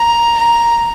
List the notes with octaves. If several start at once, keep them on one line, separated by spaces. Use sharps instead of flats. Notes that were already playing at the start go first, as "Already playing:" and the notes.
Already playing: A#5
A#5